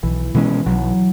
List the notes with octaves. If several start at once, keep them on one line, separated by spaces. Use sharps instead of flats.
B1 E3
B2 E3 G#3 C#4
B1 F#3